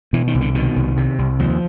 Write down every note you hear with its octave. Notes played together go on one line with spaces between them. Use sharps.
B2 E3
D#3
C2
D3
B2 D#3
C2
C3
C2
D#2 F3